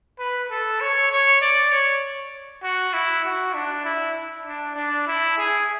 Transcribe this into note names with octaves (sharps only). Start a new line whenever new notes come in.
B4
A4
C#5
C#5
D5
C#5
F#4
E4
F#4
D4
E4
D4
D4
E4
G#4